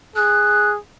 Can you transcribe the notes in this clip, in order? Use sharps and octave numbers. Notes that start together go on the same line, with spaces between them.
G#4 F#6